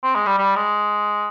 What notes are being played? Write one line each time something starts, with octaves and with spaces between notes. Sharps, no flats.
C4
G#3
G3
G3
G#3